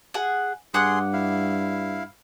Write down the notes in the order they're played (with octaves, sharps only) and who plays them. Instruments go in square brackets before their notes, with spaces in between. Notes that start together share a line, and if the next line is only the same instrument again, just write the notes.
[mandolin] G#4 F#5
[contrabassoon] G2 [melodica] G#4 C6 [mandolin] F#5 D6 F#6
[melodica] E4 F5